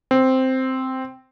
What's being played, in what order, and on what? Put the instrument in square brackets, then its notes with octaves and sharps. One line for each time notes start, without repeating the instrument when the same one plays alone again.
[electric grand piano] C4